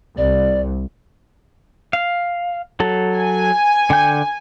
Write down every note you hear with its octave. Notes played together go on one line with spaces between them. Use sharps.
C2 D5
F5
F#3 A4
G#5
D3 G5 G6